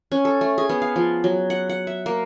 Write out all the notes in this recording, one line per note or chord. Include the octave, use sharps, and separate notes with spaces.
C#4
A4
A3
G#4
B3
F5
F3
F#3
F#5
F#5
E5
A#3